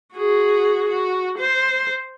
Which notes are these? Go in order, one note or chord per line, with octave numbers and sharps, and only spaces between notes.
F#4 G#4
F#4
C5